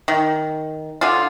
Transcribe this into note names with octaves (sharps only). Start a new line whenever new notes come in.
D#3
D3 F4